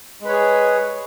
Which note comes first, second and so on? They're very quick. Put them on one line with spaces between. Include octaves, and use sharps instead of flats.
G#3 B4 C#5 G#4